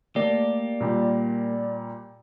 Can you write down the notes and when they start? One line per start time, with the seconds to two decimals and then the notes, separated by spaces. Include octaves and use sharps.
0.16 A3 A#3 G4 A4 D5
0.80 A#2 G3